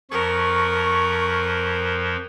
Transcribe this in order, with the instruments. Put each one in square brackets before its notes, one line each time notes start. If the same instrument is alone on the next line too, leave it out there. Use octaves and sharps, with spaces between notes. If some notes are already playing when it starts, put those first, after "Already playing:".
[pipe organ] F2 F3 [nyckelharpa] A#4 [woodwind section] C#6